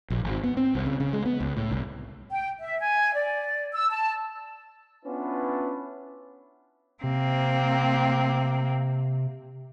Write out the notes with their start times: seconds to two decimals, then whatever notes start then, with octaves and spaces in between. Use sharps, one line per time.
0.10 A#1
0.24 G#1
0.44 B3
0.57 C4
0.75 C2
0.86 C#3
1.00 C#3
1.13 G#3
1.25 B3
1.40 C#2
1.57 A2
1.71 C2
2.32 G5
2.59 E5
2.80 G#5
3.13 D5
3.74 E6
3.90 A5
5.06 B3 C#4 D4 E4 F4 B4
7.04 C3 A#3 C4